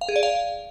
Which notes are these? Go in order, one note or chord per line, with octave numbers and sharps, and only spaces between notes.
F5
G#4
D5
F5